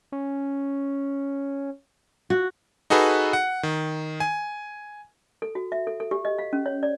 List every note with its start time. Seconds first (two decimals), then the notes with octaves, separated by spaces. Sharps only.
0.12 C#4
2.30 F#4
2.90 D#4 F#4 G#4 A4 B4
3.33 F#5
3.63 D#3
4.20 G#5
5.42 A4
5.55 F#4
5.72 E5
5.87 A4
6.00 A4
6.11 G4
6.25 D#5
6.38 F5
6.53 C#4
6.66 C#5
6.83 D5